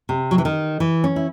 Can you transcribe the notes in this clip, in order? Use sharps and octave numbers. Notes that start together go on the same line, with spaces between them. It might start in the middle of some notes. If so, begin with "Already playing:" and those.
C3
F#3
E3
D#3
E3
C#4
E4